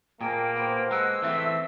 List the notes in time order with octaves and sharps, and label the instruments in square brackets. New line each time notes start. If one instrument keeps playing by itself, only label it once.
[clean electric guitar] A#2 [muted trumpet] A#3 [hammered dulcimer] G#4 A5 A#5 [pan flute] G5
[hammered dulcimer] B3 G4 C5 [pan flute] G5
[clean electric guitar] G#3 [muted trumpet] F#5 [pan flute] E6
[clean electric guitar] E3 A3 C4 [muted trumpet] E5